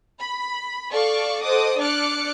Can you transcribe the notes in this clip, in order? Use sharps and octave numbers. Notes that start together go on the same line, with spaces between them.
B5
A4 D5 F5 C#6 D6
A4 C5 D#5 F#5 D6 D#6
D4 D5 D6 F6 F#6 C#7